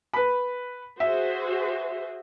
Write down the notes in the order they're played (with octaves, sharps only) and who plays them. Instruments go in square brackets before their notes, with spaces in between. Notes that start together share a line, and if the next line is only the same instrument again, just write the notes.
[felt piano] B4 B5
[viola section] F#4 G#4 C5 [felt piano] E5